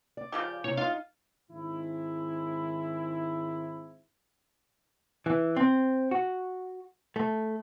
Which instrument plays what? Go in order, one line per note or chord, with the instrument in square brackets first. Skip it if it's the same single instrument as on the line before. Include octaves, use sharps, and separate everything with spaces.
[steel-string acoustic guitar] D5
[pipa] C#3 F3 G4
[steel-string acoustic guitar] C3 E4 [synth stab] C#5
[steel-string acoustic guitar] D#4 [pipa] F4 [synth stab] F5
[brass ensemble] G#2 D#3 G#3 C4 D#4 E4
[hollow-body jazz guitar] E3
C4
F#4
A3